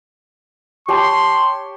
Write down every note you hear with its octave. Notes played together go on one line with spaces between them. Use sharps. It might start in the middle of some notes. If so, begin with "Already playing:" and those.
G4 C#5 A5 C6